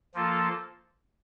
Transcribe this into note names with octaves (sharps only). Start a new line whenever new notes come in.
F3 A#3 F4 A4